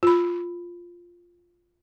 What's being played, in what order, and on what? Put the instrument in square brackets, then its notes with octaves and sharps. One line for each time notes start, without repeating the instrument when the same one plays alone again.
[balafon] F4 B5